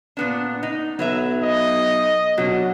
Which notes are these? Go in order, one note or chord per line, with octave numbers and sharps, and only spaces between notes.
A#2 B3 D4
D#4
B1 F#3 B4 E5
D#5
B2 F#3 D4